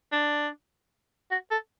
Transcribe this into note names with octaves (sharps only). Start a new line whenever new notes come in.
D4
F#4
A4